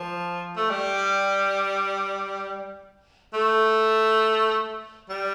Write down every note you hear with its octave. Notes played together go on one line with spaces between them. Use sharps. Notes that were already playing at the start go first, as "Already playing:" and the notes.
Already playing: F3
A3
G3
A3
G3